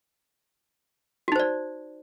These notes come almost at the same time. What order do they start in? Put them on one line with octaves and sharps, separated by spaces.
F#4 D#4 C5 D5